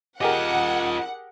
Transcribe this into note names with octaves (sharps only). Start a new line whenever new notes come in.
F4 G4 G#4 A#4 D#5 F#5